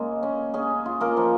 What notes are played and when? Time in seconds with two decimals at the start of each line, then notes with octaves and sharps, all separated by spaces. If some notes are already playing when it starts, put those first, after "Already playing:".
Already playing: C#3 G#3 A#3 A#4
0.23 C#4
0.54 C#4 G#4
0.86 F4
1.01 A#3 A#4
1.17 F3